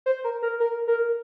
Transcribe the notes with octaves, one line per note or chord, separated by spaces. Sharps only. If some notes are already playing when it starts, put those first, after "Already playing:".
C5
A#4
A#4
A#4
A#4